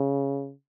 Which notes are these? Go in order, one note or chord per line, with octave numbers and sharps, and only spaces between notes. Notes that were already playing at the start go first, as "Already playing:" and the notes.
Already playing: C#3